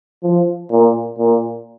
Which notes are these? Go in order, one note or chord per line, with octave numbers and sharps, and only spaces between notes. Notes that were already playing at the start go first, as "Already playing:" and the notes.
F3
A#2
A#2